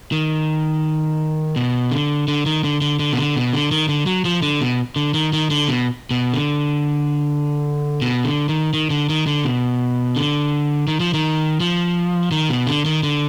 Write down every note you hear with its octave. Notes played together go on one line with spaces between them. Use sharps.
D#3
B2
D3
D3
D#3
D3
D3
D3
B2
D3
B2
D3
D#3
D3
F#3
F3
D3
B2
D3
D#3
D#3
D3
B2
B2
D3
B2
D3
D#3
D#3
D3
D#3
D3
B2
D3
D#3
F3
D#3
F3
D#3
B2
D3
D#3
D3